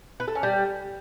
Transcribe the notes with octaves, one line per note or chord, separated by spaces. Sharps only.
B4
A4
C#4
G3